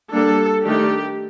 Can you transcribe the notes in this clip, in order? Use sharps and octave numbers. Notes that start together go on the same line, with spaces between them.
G3 A#3 D4 A4
D#3 A3 D4 G4